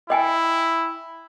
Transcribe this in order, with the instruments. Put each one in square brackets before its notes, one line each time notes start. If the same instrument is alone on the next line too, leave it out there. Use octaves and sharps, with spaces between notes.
[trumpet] E4 [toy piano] D#5 G5 G#5